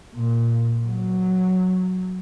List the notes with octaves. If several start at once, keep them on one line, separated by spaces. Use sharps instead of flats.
A#2
F#3